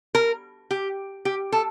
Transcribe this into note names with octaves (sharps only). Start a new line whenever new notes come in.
A#4
G4
G4
A4